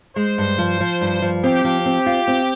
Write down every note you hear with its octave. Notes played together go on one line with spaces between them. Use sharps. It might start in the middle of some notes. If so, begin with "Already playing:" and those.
G#3 C5
G2
F3
F3
G2
F3
C4 G4
F3
C4
F4
C4